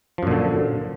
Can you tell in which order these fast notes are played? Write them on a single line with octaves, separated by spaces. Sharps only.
F3 F#2 A#2 D3